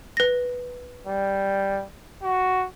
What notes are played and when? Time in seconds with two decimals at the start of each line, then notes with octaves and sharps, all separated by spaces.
0.17 B4 A#6
1.07 G3
2.23 F#4